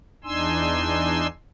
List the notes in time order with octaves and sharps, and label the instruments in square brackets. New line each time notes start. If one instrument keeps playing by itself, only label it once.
[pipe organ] E2 D4 D#4 G#5 C6 E6